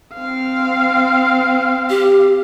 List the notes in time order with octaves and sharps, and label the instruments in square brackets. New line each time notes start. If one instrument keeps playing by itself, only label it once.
[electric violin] C4 F5
[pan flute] G4